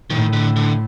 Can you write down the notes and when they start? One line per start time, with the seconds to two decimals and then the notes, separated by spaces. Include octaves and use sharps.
0.10 A2 D#3
0.33 D3
0.56 D3